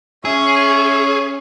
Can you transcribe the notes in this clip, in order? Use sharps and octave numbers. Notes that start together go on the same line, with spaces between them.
C#4 G#4 C#5 E5